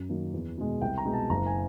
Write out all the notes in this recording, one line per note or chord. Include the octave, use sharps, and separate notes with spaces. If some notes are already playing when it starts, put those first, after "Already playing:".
Already playing: F#2
D#3 F#3 A#3 C#4
E2
B2 G#3
C2 G5
A#5
B2 G#3
A5
F#1 A#5
G#5